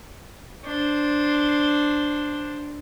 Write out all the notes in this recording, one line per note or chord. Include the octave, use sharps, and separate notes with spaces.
D4 C5